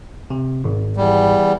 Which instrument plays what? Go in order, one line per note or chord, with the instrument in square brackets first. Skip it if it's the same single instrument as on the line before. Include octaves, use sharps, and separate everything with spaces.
[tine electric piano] C3
G#1
[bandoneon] E2 G3